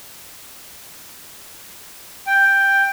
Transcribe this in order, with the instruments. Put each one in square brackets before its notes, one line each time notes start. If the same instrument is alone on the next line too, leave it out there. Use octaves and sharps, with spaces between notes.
[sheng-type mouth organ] G5